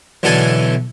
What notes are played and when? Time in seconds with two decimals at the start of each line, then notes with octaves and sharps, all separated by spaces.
0.23 B1 D3 E3 A4 G#5